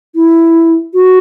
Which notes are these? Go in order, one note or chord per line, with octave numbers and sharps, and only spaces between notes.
E4
F#4